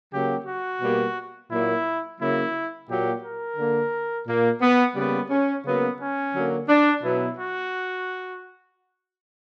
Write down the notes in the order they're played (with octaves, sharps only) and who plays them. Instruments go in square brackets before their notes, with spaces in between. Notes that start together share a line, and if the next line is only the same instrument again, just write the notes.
[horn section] C#3 F#3 A#3 G4
F#4
B2 G3 A#3
A#2 F#3 A#3 E4
C#3 F#3 A#3 E4
A#2 F#3 A#3 G4
A#4
D3 A#3
A#2 A#3
B3
C#3 G3 A#3 B3
C#4
C#3 F#3 A#3 B3
C#4
D3 F#3 A#3
D4
B2 F#3 B3 E4
F#4